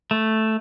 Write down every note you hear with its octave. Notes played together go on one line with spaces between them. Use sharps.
A3